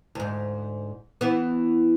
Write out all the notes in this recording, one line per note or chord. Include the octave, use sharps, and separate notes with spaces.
D2 G#2
E3 B3